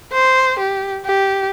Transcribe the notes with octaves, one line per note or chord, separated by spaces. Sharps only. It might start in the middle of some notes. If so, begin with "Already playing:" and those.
C5
G4
G4